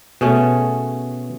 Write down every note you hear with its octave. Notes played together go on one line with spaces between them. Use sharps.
B2 A3 C#4 G#4